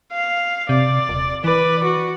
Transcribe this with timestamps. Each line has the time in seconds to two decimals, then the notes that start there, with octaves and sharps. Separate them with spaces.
0.13 F5
0.69 C3 D5
1.09 D#1
1.44 E3 B4 D5
1.83 F#4